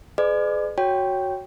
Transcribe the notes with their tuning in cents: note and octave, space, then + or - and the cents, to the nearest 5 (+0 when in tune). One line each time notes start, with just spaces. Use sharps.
G#4 +25 B4 +45 D5 +40
F#4 +0 C#5 +0 G5 +0